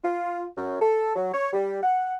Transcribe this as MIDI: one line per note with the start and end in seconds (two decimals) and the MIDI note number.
0.04 0.46 65
0.57 0.77 42
0.81 1.14 69
1.15 1.33 54
1.34 1.53 73
1.53 1.79 55
1.83 2.16 78